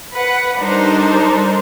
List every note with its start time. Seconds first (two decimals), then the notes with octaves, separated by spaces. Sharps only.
0.12 B4 F#5
0.57 G3 D4 D#4 A4 A#4 C5